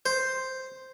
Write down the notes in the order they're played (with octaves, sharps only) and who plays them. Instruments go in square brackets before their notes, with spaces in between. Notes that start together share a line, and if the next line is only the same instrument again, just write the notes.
[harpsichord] C5